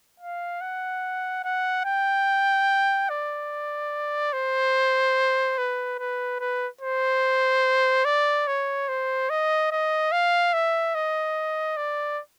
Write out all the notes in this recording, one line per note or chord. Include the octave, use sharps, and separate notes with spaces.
F5
F#5
F#5
G5
D5
C5
B4
B4
B4
C5
D5
C#5
C5
D#5
D#5
F5
E5
D#5
D5